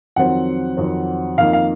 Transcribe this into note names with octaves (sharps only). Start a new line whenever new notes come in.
F2 D#3 F#3 C4 F#5
F2 D#3 F#3 C4
F2 D#3 A#3 D#4 F5
F5